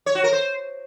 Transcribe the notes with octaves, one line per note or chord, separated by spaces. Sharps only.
C#5
F#4
A#4
C5